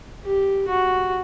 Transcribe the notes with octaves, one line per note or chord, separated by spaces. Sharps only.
G4
F#4